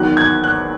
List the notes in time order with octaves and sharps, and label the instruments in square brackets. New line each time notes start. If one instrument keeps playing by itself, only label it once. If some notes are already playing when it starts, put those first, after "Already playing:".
Already playing: [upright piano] E2 D#3 F#3 F#6
G#6
F#6